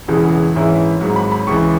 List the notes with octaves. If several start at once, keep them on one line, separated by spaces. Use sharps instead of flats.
E1 E2 C#3 E3
G#1 G#2 E3 C#4 E4
G#1 G#2 F#3
B5
B5
C#2 C#3 E3 C#6